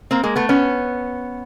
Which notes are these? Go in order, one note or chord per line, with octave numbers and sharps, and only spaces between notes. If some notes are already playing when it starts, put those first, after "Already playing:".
A#3 C4
G#3 A#3
A3 B3
B3 C#4